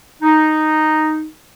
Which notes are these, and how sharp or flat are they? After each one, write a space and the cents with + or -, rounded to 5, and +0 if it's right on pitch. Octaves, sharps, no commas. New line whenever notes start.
D#4 -5